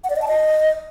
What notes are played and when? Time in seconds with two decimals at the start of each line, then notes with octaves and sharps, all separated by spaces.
0.04 F#5
0.10 D5
0.16 D#5
0.22 A5
0.28 D#5